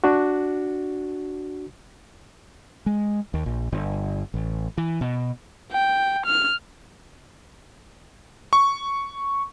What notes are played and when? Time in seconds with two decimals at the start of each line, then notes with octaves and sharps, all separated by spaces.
0.04 D4 F#4
2.86 G#3
3.34 D#2
3.46 A#1
3.72 G1
4.34 A1
4.78 E3
5.01 B2
5.72 G5
6.26 F6
8.53 C#6